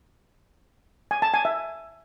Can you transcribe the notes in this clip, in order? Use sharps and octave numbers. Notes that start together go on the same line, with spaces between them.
G#5
A5
G#5
E5